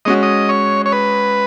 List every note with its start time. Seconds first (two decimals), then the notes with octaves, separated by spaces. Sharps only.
0.05 G#3 C#4 F#4 D#5
0.23 D#5
0.49 C#5
0.86 C#5
0.92 B4